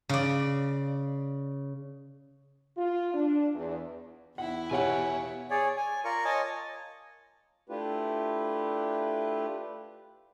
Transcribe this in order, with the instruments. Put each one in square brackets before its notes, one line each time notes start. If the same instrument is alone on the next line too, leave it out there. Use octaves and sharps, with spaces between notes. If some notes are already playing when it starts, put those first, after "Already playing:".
[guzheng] C#3 D5
[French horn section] F4
D4
E2
[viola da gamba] E2 E4 [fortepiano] F#5
[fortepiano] B2 [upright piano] G4 C#5 F#5 [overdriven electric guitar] F5 G#5
[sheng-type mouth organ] G#4 C#5 D5
G#5
F4 A#4 D5 C#6
C#5 D#5 G#5 A5
[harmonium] A3 D4 E4 F4 G4 B4